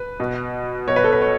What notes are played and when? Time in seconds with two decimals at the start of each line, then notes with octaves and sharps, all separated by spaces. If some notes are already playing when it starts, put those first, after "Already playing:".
Already playing: B4
0.20 B2
0.88 B2 C#5
0.96 B4
1.04 A4
1.13 B4
1.22 C#5